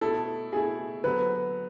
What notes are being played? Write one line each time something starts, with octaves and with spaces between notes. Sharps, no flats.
B2 A3 E4 A4
B2 A3 E4 G#4
D3 F#3 B3 B4